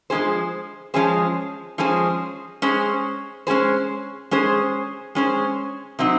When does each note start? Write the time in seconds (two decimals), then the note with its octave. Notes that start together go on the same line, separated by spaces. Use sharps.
0.10 F3 G#3 C#4 G#4 C5
0.94 F3 G#3 C#4 G#4 C5
1.78 F3 G#3 C#4 G#4 C5
2.62 G#3 C#4 G#4 C5
3.47 G#3 C#4 G#4 C5
4.31 G#3 C#4 G#4 C5
5.15 G#3 C#4 G#4 C5
5.99 C3 F#3 C4 D#4